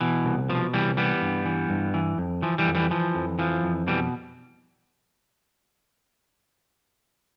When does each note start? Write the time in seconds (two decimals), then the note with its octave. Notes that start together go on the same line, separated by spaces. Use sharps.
0.01 B2 E3
0.25 C2
0.49 B2 F3
0.74 C2 E3 G3
0.97 E3 G3 B3
1.22 G2
1.45 E3
1.70 G2
1.94 E3
2.18 F2
2.42 E3 F3
2.58 E3 G3
2.66 F2
2.75 E3 G3
2.91 E3 F3
3.15 F2
3.39 E3 F3
3.63 F2
3.87 B2 E3 G3